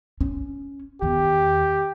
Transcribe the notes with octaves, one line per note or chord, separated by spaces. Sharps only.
C#4
E2 D#3 G4